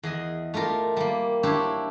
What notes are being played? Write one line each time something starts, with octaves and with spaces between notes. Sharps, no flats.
E2 G#4 D#5
A3 F4 G4 A#4
G3 A#3
D4 E4 G4 C5 C#5